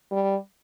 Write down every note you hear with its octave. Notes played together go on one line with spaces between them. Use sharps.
G3